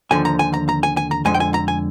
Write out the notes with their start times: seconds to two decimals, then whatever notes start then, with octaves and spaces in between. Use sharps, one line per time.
0.11 D#2 D3 F3 G#5
0.25 A#5
0.39 G#5
0.54 A#5
0.69 A#5
0.83 G#5
0.97 G#5
1.11 A#5
1.25 F2 D3 G#3 G#5
1.34 G5
1.40 G#5
1.54 A#5
1.68 G#5